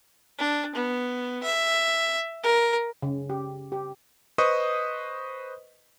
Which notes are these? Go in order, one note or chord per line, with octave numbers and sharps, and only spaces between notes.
D4
B3
E5
A#4
C#3
G4
G4
B4 C5 D#5 C#6 D#6